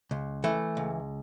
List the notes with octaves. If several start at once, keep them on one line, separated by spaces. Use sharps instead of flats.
C#2
E3 A3
C#2